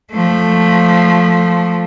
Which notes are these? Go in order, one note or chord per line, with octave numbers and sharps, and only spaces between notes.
F3 A3